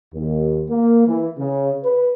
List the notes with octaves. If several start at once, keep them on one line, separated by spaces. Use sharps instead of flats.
D#2
A#3
E3
C#3
B4